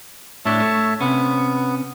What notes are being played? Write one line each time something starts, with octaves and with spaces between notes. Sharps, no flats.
A2 D4 G4 C#5 E5 A5
A3
C3 B3 C#4